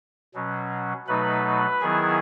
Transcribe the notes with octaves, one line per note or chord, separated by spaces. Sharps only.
B2 F#3 C#4
B2 F#3 A3 D#4 B4 B5
D#3 F#3 B3 E4 G#4 G#5